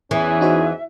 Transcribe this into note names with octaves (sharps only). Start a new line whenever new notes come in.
E2 E3 C#4 G#4 E5
D#4 F#4 C5